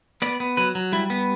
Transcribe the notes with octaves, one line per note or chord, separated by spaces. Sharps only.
B3 D5
B3
F#3 B4
F#3
G3 E4
B3